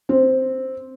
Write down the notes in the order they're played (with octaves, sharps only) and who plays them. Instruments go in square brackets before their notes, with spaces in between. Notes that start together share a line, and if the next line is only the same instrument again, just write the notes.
[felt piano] C4